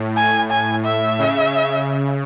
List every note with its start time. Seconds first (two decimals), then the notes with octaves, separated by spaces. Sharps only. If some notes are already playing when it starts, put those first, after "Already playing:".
Already playing: A2
0.16 G#5
0.51 G#5
0.85 E5
1.19 C#3